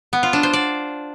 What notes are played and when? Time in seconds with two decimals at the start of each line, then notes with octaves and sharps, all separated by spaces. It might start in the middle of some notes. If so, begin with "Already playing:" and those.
0.13 B3
0.23 F4
0.33 D4
0.43 C5
0.53 D5